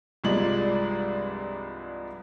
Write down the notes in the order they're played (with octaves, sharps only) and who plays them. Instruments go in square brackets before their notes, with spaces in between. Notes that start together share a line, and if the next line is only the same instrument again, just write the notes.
[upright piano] C2 G2 F3 G#3 D5 F#7